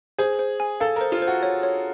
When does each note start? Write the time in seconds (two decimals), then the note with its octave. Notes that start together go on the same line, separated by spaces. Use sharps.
0.18 G#4 C5
0.39 C5
0.60 G#5
0.80 A4 F5
0.96 A#4
1.01 C5
1.12 F4
1.22 C5
1.27 F#4
1.43 C#5
1.63 C#5